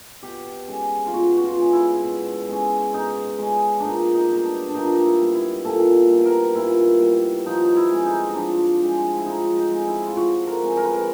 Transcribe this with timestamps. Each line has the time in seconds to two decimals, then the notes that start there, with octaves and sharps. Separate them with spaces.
0.23 B2 G4
0.68 G#3 C#4
1.07 F4
1.13 B2 F#4
1.37 F#4
1.44 F4
1.58 G#3 C#4
1.73 E4
2.03 B2
2.48 G#3 C#4
2.93 B2 D#4
3.39 G#3 C#4
3.80 A#2 D4 D#4
4.15 D#4
4.29 G3 B3 D#4
4.45 D4
4.69 D4
4.74 A#2 D#4
4.85 D4
4.95 D#4
5.05 E4
5.19 G3 B3
5.35 E4
5.65 A#2 A4
6.10 G3 B3
6.25 A#4
6.55 A#2 E4
7.01 G3 B3
7.45 F3 D#4
7.65 D#4
7.76 E4
7.91 G#3 C4
8.06 D#4
8.29 D#4
8.36 F3 D4
8.82 G#3 C4
9.18 E4
9.26 F3 D#4
9.57 D#4
9.72 G#3 C4
9.87 E4
10.07 F4
10.17 F3 F#4
10.47 A#4
10.62 G#3 C4
10.77 A#4
10.85 B4
10.93 A#4